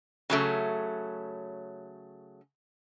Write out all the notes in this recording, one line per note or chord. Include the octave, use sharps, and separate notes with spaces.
C#3 F#3 A3